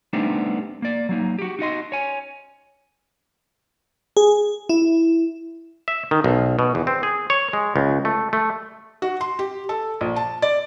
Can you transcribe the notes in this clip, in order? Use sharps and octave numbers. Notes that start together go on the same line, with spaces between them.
G3 A3 B3 C4 D4 D#4
A#3 D5
F#3 A#3 D#4
F#4 G4
D#4 F#4 D#5 C6
C#5 G#5
G#4
E4
E5
D#3
B1
B2
E2
C4
G#4
C#5
G#3
C#2
A3
A3
F#4
C6
G4
A4
A#1
A5
D5